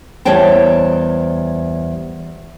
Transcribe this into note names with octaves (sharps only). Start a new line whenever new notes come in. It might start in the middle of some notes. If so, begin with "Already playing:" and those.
E2 G3 C5 C#5 G5 A5